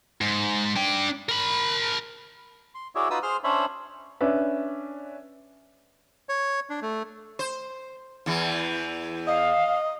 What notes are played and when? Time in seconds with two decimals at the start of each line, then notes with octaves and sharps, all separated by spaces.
0.21 G#2
0.76 D4 G5
1.29 A#4 B5
2.75 C6
2.95 E4 F#4 G#4 C#5 D5 E5
3.10 D#4 F4 F#4 B4 D#6 E6
3.23 G#4 C5 C6 F6
3.44 C#4 D4 C5 C#5 E5 B5
4.21 C#4 D4 B4 E5
6.29 C#5
6.70 D4
6.82 A3
7.39 C5
8.26 E2 E3
9.27 D#5 F5